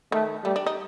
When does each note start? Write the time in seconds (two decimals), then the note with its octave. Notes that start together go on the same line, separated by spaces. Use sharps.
0.12 D#3 A3
0.44 G3 A3
0.56 D4
0.66 D#4